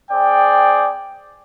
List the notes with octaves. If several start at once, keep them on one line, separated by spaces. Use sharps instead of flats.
C4 G#4 D5 G5